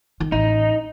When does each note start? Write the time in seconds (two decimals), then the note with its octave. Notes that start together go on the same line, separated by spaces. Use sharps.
0.20 D#3
0.32 A1 D#4